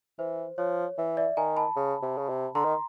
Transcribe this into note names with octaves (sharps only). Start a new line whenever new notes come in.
E3 C5
F3 C#5
E3
D5 E5
D#3 G#5 A#5
A5 B5
C#3
C3
C#3
C3
D3 A#5 C6
D#3